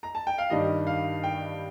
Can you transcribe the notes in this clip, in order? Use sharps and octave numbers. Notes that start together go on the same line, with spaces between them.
A#5
A5
G5
F5
G2 D#3 G3 D4 D#5
F5
G5